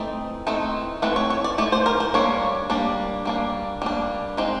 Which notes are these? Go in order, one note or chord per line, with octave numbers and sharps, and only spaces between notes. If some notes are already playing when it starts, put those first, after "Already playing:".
Already playing: E3 A3 C4 D#4
E3 A3 C4 D#4
E3 A3 C4 B4
C#5
C#5
D5
E3 A3 D5
C5
A#4
C5
G3 A#3 D4 C#5
G3 A#3 D4
G3 A#3 D4
G3 A#3 D4
G#3 C4 D#4